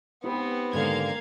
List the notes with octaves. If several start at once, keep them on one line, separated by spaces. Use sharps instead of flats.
B3 C4 D#4 G4 B4
G#2 D3 D#3 A#3 F5 G#6